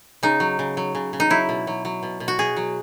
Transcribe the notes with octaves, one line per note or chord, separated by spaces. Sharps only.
C#3 D#4
F#3
C#3
F#3
C#3
C#3
D#4
F#3 E4
B2
F#3
F#3
B2
B2
F#4
B2 G#4
F#3